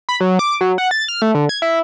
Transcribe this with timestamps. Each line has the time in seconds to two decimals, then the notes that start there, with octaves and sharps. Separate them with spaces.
0.09 B5
0.21 F#3
0.39 D6
0.61 F#3
0.78 F#5
0.91 A6
1.08 F6
1.22 A3
1.35 D3
1.49 G#6
1.62 E4